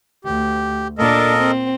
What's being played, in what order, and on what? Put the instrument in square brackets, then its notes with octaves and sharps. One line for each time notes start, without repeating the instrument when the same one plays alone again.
[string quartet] D2 [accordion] G4
[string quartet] A#2 D4 [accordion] A4 A#4 D#5
[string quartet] C4